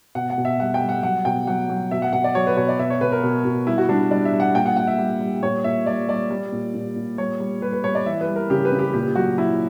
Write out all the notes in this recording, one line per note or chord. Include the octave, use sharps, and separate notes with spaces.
B2 F#5
F#5
B2
E5
G3 F#5
G5
G3
F#5
F#3 F#5
B2 G5
F#3 F#5
F#3
B2 E5
F#5
B2 F#5
D5
F#3 C#5
B4
B2 C#5
D5
B2 E5
C#5
B2 B4
A#4
B2
B2
G3 E4
F#4
G3 D4
G3 D5
E5
G3
F#5
A#2 G5
F#5
A#2 F#5
E5
G3
G3
A#2 C#5
A#2 E5
G3 D5
G3 D5
G3
A#2
A#2
A#2
G3 C#5
G3
G3 B4
B4
G3 C#5
D5
E3 E5
B4
G3
A#4
C#3 G4
B4
C#3
G4
A#2 G4
F#3 F#4
F#3 E4